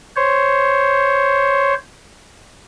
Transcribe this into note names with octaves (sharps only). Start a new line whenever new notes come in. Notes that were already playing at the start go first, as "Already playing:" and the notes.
C5 C#5